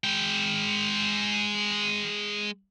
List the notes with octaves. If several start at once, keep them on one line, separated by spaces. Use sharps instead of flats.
G#3 G5